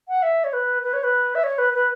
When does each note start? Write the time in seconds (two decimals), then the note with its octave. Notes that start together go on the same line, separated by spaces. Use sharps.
0.09 F#5
0.23 E5
0.44 C#5
0.53 B4
0.83 B4
0.93 C#5
1.03 B4
1.35 E5
1.44 C#5
1.58 B4
1.74 B4